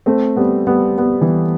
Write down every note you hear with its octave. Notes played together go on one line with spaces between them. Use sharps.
A3 C4
G3 B3
G3 B3
G3 B3
E3 G3